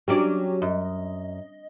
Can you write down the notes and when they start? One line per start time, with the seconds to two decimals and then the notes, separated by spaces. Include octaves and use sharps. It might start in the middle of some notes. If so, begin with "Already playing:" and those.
0.08 F#3 C#4 D4 G4 D5
0.62 F#2 D#5